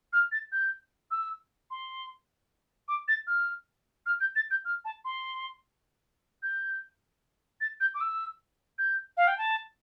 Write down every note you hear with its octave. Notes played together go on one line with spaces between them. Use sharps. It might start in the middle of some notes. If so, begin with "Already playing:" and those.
F6
A6
G6
E6
C6
D6
A6
F6
F6
G6
A6
G6
F6
A5
C6
G6
A6
G6
D6
E6
G6
F5
G5
A5